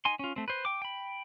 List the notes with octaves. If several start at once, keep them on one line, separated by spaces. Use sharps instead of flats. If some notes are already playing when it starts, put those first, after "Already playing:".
D#4 G#5 C6
C#4 F4
A3 C4
B4 C5
G5 D6
G5 B5